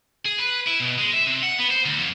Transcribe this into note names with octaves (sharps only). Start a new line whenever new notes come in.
G#4
B4
E4
B2
G#3
E5
C3
F#5
B3
C5
D2
F2